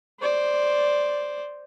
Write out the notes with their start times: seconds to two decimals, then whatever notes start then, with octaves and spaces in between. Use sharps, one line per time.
0.20 C5 D5